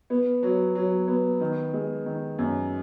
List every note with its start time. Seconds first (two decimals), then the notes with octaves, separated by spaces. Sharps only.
0.10 B3
0.43 F#3
0.75 F#3
1.08 B3
1.41 D#3
1.73 G#3
2.06 D#3
2.38 F#2